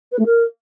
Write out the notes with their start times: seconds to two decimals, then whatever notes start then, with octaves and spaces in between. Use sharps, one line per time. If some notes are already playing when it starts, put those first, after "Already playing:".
0.11 B4
0.18 A3
0.25 A#4